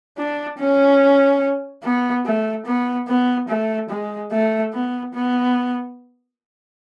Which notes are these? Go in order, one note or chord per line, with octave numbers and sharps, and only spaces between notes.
D4
C#4
B3
A3
B3
B3
A3
G#3
A3
B3
B3